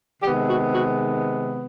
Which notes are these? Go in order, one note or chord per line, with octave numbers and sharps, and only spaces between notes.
C3 D#3 G#3 B3 G4
F#4
F#4